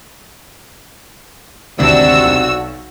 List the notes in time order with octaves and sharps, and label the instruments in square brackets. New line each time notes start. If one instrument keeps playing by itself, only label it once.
[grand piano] G#1 D2 [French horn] C3 [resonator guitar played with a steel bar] C4 D4 E4 [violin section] F#4 E6
[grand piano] B1